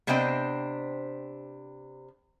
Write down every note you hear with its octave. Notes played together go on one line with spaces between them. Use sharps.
C3 B3 D4 C5 D#5 G5